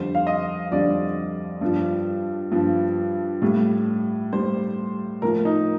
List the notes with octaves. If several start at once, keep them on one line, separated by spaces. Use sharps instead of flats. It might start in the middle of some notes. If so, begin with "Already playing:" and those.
Already playing: F2 D3 G3 C5
F5
D#5
F2 D3 G3 D5
G2 F3
G2 F3
A2 G3
A2 G3 C5
A2 F3 A#4
D#4